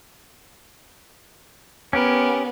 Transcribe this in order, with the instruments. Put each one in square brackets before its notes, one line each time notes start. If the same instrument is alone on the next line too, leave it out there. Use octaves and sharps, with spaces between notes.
[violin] B3 [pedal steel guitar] C#4 G4 A#4